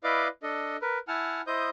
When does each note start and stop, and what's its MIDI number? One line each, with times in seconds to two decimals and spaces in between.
0.04 0.28 64
0.04 0.28 71
0.04 0.28 74
0.04 0.28 75
0.04 0.28 77
0.04 0.28 86
0.43 0.77 62
0.43 0.77 69
0.43 0.77 75
0.82 0.98 70
0.82 0.98 71
1.08 1.41 64
1.08 1.41 78
1.08 1.41 80
1.08 1.41 81
1.08 1.41 89
1.47 1.70 64
1.47 1.70 72
1.47 1.70 75
1.47 1.70 87
1.47 1.70 91